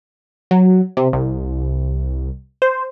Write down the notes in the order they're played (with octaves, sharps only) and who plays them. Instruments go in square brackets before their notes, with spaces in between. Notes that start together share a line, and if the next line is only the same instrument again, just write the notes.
[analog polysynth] F#3
C3
C2
C5